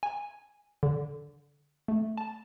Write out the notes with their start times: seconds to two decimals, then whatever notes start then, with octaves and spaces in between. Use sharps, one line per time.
0.03 G#5
0.83 D3
1.88 A3
2.18 A5